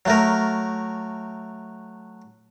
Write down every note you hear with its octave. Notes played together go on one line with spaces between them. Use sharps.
F#3 A3 A#4